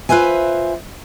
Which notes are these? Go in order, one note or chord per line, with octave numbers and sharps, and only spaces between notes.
F4 B4 C5 E5 G#5